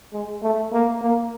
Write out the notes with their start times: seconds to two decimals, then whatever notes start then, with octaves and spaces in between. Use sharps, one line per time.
0.13 G#3
0.43 A3
0.73 A#3
1.02 A#3